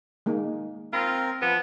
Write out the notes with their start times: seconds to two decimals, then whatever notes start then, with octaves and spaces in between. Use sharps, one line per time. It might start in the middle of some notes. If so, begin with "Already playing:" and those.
0.26 G#3 A#3 D#4
0.93 C4 F4 A#4 B5
1.42 F3 B3 B4